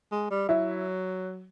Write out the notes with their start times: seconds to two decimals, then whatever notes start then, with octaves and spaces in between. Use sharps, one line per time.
0.12 G#3
0.31 G3
0.49 F#3 E4